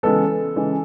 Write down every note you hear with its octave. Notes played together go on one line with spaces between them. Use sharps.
C#3 E3 G#3 B3 A4
C#3 E3 G#3